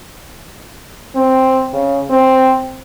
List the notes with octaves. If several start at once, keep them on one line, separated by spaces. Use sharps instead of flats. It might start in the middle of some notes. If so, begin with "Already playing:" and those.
C4
C#3
C4